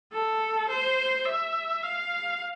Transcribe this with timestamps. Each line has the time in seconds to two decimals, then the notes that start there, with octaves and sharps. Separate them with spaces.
0.13 A4
0.69 C5
1.26 E5
1.83 F5